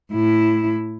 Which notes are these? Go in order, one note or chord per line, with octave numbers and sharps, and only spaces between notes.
A2 E4